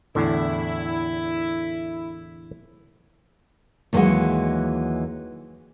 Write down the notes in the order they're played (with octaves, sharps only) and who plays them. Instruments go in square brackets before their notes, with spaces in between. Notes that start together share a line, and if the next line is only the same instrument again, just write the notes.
[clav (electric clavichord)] E2 A2 D3 [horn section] E4
[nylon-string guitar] D#2 A#2 E3 F#3 G#3 F#5